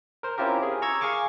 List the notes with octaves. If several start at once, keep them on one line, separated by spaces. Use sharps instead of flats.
A#4 C5
C4 C#4 E4 F4 G4 A#4
G#4
A#5 C#6 E6 G#6
G#4 F5 G#5 C#6 D6